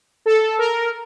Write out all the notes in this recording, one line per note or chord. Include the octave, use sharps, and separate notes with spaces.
A4
A#4